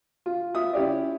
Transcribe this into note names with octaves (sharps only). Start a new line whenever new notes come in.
F4
F4 E5 D#6
C#4 E4 G4 D5